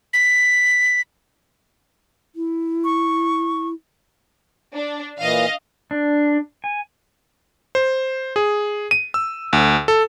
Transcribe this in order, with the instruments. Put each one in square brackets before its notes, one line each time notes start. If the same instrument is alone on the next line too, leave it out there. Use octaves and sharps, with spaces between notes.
[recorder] B6
[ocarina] E4
[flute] C#6
[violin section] D4
[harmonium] A#2 E3 [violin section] D#5 F5
[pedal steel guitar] D4
G#5
[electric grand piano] C5
G#4
D#7
E6
D2
A4